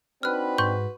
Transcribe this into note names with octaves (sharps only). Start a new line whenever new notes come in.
C4 D4 D#4 F#4 B4 F6 F#6
G#2 C6 C#6 G6